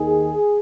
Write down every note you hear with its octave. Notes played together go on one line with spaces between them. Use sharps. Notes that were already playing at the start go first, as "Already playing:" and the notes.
Already playing: D#2 D#3 G#4